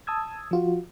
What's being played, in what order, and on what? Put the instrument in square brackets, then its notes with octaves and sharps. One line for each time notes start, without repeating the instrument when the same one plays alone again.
[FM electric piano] A5 D#6 E6 G#6
F3 F4 F#4